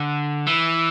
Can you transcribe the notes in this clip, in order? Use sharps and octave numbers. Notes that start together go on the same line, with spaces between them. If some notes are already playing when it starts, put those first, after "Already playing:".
Already playing: D3
E3